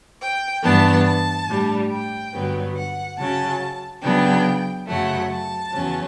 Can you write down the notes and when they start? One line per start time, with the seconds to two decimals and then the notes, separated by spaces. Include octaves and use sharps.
0.21 G5
0.63 G2 E3 B3 D4 A5
1.06 A5
1.48 A2 G3 D4
1.91 G5
2.34 G2 D3 F#3 B3
2.76 F#5
3.18 C#3 F#3 C#4 A5
4.03 C#3 F#3 B3 D4 G5
4.88 F#2 C#3 F#3 A3 F#5
5.30 A5
5.73 E2 C#3 F#3 C#4